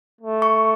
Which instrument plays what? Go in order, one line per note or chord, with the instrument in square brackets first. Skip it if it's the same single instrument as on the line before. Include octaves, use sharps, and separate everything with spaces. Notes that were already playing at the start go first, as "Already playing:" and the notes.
[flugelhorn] A3
[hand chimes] C#6